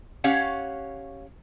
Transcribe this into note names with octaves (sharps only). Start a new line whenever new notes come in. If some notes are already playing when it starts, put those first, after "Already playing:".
C#4 G4 C#5 F5 F#5